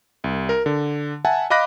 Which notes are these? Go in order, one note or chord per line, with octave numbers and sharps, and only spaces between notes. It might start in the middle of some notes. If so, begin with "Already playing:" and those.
C2
A#4
D3
E5 F#5 G#5 A5
D#5 F5 B5 D6 F#6 A#6